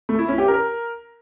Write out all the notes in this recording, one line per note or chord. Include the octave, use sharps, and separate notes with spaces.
A3
E4
C#4
G4
A#4